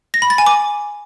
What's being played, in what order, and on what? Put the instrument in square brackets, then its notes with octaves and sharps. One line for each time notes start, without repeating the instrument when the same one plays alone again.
[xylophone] A#6
B5
A6
G#5
D6